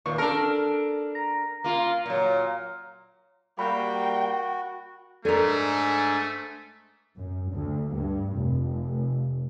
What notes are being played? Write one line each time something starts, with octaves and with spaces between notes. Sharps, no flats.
D#2 A#2 C#6
D4 A4 A#4
A#5
A#3 F4
A#2 F#3
G3 A#3 F#4 G5 B5
G#2 A3 D4 A4 A#4 G#5
F#2
D2
G2
F1